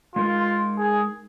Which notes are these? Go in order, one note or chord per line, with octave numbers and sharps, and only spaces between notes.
G#3 D#4 F4 A#4
G#4